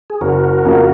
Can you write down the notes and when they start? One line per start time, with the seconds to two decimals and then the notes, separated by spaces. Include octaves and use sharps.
0.10 G#4
0.21 F#1 F#4 A#4
0.65 F2 C#3 F3 A#3